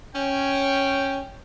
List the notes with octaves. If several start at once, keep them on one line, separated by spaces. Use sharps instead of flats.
C#4 G5